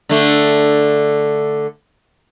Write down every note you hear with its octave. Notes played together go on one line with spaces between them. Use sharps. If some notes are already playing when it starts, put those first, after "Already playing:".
D3 A3